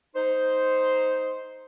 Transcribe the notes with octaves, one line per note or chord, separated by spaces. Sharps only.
D#4 C5